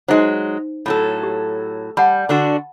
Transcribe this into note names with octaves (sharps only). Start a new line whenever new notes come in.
F#3 G#3 D#4 C5
A2 F#3 A4
G4
G3 F#5 A5 B5
D3 D4 F#4